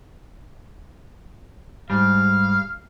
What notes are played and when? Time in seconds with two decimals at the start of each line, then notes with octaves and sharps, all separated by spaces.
1.90 G#2 G3 F5